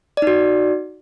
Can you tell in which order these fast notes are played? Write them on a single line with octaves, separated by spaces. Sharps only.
D5 D#4 F#4